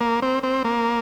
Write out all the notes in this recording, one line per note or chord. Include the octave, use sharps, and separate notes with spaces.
A#3
C4
C4
A#3